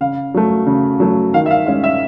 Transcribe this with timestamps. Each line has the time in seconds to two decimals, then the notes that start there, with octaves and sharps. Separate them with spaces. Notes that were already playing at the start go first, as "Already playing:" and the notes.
0.01 C#3 F5
0.34 F#3 A3
0.66 C#3
1.00 F#3 A3
1.34 D#3 F5
1.46 E5
1.51 F5
1.66 G#3 C#4 F5
1.84 E5